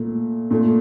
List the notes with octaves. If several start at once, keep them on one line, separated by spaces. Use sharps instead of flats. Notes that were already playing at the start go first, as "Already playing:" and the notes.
Already playing: A#2 A3
A#2 A3